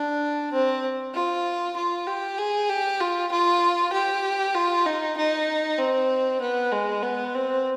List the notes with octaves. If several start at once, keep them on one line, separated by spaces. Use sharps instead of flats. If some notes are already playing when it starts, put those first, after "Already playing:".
Already playing: D4
C4
F4
F4
G4
G#4
G4
F4
F4
G4
F4
D#4
D#4
C4
B3
G#3
B3
C4